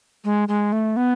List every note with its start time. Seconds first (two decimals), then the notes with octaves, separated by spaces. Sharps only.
0.25 G#3
0.48 G#3
0.72 A3
0.97 B3